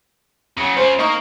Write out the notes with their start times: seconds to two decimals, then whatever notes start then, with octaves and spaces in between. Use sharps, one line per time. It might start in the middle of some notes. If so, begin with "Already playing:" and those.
0.57 C#3 F#3
0.77 C#3 F4 C5
0.99 A#3 D#4 A#4 C#6